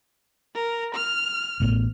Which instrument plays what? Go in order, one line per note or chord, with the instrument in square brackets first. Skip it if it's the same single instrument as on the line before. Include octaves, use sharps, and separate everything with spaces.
[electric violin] A#4
F6
[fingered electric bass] A1 A2 B3